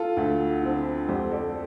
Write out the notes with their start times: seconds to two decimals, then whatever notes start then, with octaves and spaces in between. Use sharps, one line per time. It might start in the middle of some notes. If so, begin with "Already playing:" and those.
Already playing: F4 A4
0.17 D2
0.63 D3 F3 C4
1.08 F2 G4 C5
1.31 A4 D5